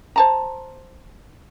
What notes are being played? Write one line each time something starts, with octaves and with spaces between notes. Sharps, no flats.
C5 A5 A#5